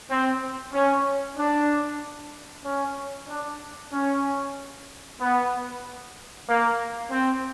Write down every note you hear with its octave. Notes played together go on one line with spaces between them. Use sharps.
C4
C#4
D4
C#4
D4
C#4
B3
A#3
C4